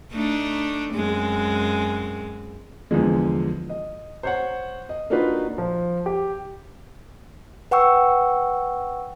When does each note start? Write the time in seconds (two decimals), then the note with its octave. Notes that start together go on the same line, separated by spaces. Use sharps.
0.12 A3 D4 D#4
0.95 F#2 G#3 C4
2.91 E2 D3 F3 G#3
3.70 D#5
4.23 C5 C#5 F#5
4.89 D#5
5.10 A#3 D4 D#4 F4 F#4 B4
5.58 F3
6.06 G4
7.71 B4 F#5 G5 C#6 E6